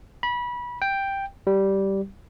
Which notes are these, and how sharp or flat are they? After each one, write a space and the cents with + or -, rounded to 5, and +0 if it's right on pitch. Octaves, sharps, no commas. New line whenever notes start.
B5 -25
G5 +5
G3 -10